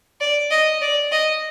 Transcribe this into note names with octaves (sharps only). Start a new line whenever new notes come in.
D5
D#5
D5
D#5